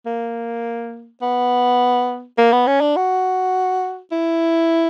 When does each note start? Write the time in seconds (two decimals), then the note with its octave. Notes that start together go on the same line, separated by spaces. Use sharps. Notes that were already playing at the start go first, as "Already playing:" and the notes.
0.06 A#3
1.22 B3
2.38 A#3
2.52 B3
2.67 C#4
2.81 D4
2.96 F#4
4.12 E4